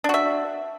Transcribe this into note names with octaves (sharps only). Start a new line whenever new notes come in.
D4 F#4 E5